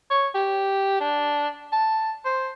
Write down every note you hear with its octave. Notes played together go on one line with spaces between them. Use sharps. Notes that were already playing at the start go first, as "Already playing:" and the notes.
C#5
G4
D4
A5
C5